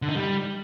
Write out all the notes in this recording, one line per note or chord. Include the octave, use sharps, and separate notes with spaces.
D3
D#4
G3